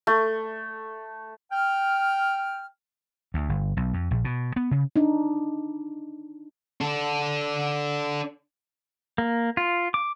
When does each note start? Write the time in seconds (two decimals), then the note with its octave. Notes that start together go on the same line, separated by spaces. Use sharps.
0.07 A3
1.52 G5 F6
3.34 D2
3.49 G1
3.77 B1
3.94 F2
4.11 A#1
4.25 B2
4.56 B3
4.71 C#3
4.96 D4 D#4
6.81 D4 A4
9.18 A#3
9.57 F4
9.94 D6